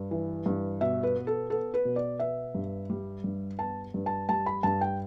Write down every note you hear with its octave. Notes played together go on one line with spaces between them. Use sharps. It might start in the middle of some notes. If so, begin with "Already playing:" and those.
Already playing: G2
E3
G2
B2 E5
B4
B3
A4
B3 A4
B4
B2
D5
B3 E5
G2
G3
G2
B3 A5
G2
A5
G3 A5
B5
G2 A5
G5